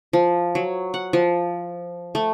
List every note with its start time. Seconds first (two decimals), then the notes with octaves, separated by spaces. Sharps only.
0.13 F3
0.55 F#3
0.94 F#5
1.13 F3
2.15 A3